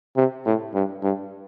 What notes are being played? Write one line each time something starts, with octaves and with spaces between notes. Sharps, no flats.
C3
A2
G2
G2